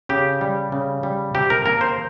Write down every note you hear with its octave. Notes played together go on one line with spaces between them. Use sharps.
C#3 G4
G3
C#3
G3
C3 G4
A#4
A#3 A#4
C5